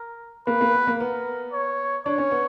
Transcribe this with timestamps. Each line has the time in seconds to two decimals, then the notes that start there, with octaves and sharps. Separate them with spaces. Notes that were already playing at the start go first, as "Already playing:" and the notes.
Already playing: A#4
0.47 A#3 B4
0.61 A#3
0.74 B3
0.87 A#3
1.00 B3 A#4
1.52 C#5
2.05 D4 C#5
2.18 C#4
2.31 B3